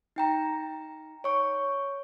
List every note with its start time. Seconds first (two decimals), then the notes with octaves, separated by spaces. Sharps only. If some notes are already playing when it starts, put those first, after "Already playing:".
0.16 D#4 G5 A#5
1.24 C#5 C#6